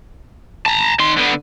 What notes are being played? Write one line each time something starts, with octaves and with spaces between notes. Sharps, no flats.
A5 A#5
D#3 C6
D3 B3